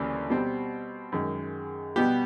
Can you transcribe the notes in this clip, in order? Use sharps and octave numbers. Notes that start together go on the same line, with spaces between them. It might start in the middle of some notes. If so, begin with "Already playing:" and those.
Already playing: D2 C#3 E3 G3 A#3
B2 G3 C4
F#2 D#3 G#3
B2 G3 B3 G4